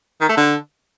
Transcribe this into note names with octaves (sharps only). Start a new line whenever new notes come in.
D#3
A3
D3